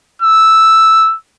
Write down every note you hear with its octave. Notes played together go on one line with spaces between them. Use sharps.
E6